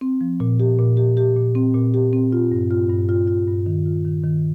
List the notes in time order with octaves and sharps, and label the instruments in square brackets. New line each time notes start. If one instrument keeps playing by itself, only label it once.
[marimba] C4
F3
A#2
G4
A#2
G4
G4
A#2
C4
A#2
G4
C4
F4
G2
F4
G2
F4
F4
G2
D#3
F4
D#3
D#3